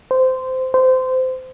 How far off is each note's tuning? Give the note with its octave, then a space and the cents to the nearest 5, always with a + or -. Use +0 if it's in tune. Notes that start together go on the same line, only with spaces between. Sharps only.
C5 -15
C5 -20